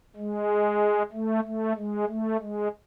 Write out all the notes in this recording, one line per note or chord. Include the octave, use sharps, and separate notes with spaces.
G#3
A3
A3
G#3
A3
G#3